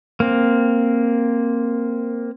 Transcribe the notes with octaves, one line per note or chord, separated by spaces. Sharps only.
A#3 C4